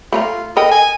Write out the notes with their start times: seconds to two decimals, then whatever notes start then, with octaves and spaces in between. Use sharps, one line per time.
0.12 A3 F4 B4 A#5
0.57 A4 A#4 D#5 G5
0.71 G#5